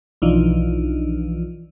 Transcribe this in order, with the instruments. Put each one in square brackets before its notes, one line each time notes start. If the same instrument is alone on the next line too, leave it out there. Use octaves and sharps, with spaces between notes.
[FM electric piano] B1 E3 F3 D4 D#4 F4